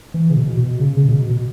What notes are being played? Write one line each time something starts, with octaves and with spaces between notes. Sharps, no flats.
E3
C#3
B2
B2
C#3
C#3
B2
B2